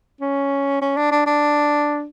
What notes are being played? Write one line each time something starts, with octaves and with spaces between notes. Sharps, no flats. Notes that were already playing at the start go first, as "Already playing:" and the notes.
C#4
C#4
D4
D4
D4